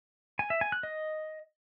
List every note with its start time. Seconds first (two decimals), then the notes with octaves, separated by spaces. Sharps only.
0.39 G#5
0.50 E5
0.61 G#5
0.72 F#6
0.83 D#5